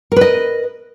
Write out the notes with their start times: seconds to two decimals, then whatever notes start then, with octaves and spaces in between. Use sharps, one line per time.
0.12 A#4
0.16 B4
0.21 D#5